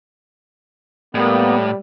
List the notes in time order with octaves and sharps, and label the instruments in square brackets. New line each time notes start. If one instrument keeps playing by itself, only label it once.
[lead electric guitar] A2 [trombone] G3 [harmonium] A#3 B3